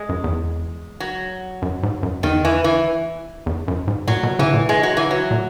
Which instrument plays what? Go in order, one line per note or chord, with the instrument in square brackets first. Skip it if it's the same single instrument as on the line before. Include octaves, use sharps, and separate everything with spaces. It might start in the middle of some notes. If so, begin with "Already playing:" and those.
Already playing: [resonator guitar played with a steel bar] G#3
[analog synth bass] F#2
E2
[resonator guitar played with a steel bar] F#3
[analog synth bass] F#2
G#2
F#2
[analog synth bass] E2 [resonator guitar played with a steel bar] D#3
[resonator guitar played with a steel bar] E3
E3
[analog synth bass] E2
F#2
G#2
[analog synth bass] A#2 [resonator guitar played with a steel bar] F#3
[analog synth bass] B2
[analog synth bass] C#3 [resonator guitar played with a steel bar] E3
[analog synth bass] A#2
[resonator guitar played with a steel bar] G#3
F#3
E3
F#3
[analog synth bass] A#2